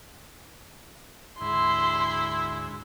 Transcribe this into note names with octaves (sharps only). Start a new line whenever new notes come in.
D2 G#2 E4 C6